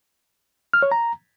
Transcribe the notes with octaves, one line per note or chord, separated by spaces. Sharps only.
F6
C#5
A#5